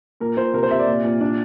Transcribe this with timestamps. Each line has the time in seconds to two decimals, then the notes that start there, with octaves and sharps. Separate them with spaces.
0.20 A#2 A#4
0.37 A#2 C5
0.53 C3 A#4
0.63 C5
0.71 C3 E5
0.79 D5
0.87 A#2
1.04 A#2
1.21 D4